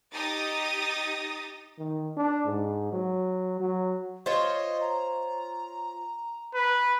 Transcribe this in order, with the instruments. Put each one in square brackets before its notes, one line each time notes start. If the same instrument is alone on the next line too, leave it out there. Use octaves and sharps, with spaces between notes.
[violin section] D#4 G4 D#6 A6 A#6
[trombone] D#3
D4
G#2
F#3
F#3
[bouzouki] F4 C5 C#5 [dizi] D#5
[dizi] A#5
[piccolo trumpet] B4